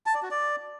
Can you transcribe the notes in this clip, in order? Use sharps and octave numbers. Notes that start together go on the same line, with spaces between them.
A5
D5
F#4
D5